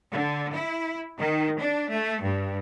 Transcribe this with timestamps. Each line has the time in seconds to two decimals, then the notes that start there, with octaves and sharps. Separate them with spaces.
0.12 D3
0.53 E4
1.18 D#3
1.58 D4
1.91 A3
2.23 G2